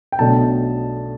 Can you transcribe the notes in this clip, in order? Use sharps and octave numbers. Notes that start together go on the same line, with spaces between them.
G5
B1 B2 A3 D4 A5